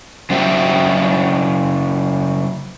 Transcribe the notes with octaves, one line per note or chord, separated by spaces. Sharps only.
C#3 F#3 C5 E5 G5